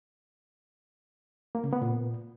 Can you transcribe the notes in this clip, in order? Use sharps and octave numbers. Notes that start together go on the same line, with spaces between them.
A#3
C#3
B3
A#2